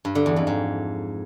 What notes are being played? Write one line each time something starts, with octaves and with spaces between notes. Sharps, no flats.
G2
D3
E2
F2
G#2